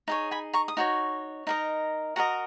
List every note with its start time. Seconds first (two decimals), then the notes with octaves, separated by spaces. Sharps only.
0.08 D#4 G#4 C#5
0.31 G#5 B5
0.53 A#5 C#6
0.68 D#6
0.77 D#4 F#4 C#5
1.47 D#4 A#4 D#5
2.16 F#4 A#4 D#5 F#5 A#5